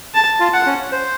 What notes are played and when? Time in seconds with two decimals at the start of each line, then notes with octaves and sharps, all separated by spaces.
0.14 A5
0.40 F4
0.54 F#5
0.66 C#4
0.92 C5